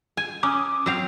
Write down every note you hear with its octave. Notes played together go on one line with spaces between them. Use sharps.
G#5
C#4 D6 D#6
F#3 C4 F5 E6